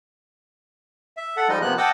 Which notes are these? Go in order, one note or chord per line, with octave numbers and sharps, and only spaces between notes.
E5
A4 F#5
F3 G3 G#3 D#4 D#5
C3 F3 A#3 B3 F#6
D#5 F#5 G5 A5 D6 E6